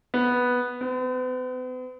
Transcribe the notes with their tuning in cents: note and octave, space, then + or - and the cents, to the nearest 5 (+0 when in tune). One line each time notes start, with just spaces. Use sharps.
B3 -5
B3 +45